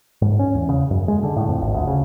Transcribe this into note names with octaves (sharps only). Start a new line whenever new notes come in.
G#2
C#4
E2
C#3
F#2
G#3
D3
A2
F2
G#1
D2
C#3